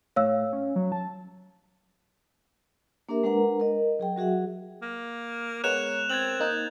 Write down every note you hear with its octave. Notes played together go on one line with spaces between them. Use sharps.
A2 C#5 F5 E6
C#4
F#3
A5
A#3 D4 G4 A#4 E5
G#3 D4 A#4 B4 F#5 A#5
A#4 D#5
F#3 G#4 G5
F#3 F#4 G#4 E5 F#5
A#3
G#3 B3 A#4 C#5 F#6 E7 F7
C4 G#6 A6 F#7
A#3 D#4 G6 F#7